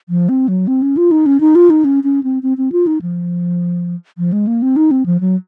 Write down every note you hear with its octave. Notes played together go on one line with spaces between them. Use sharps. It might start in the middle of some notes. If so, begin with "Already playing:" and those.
F3
C4
F#3
C4
C#4
F4
D#4
C#4
D#4
F4
D#4
C#4
C#4
C4
C4
C4
F4
D#4
F3
F3
G#3
A#3
C4
D#4
C4
F3
F#3